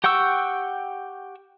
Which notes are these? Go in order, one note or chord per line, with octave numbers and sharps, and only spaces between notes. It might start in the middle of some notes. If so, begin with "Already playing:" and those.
G4 F#5 G5 C#6 E6